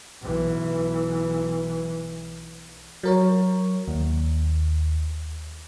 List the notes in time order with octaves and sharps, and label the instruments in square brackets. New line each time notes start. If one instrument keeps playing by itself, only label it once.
[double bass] B1 E3
[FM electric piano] F#3 A#4 C#5
D#2